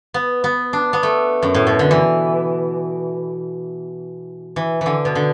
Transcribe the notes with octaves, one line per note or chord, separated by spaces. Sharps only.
B3
B3
D4
B3
A3
F#2
A2
B2
D3
E3
E3
D3 E3
B2
D3